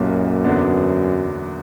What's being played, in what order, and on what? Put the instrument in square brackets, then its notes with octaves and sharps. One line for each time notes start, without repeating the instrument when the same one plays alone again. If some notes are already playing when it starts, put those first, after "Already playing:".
Already playing: [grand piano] B1 A#2 G3 A#3 E4 [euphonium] F#2
[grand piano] E2 D3 F#3 B3 D4